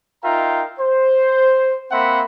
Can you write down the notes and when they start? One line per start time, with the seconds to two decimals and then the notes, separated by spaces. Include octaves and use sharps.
0.24 D#4 F4 A#4 E5 G5 A#5
0.80 C5
1.91 A#3 C4 E5 F#5 B5 C6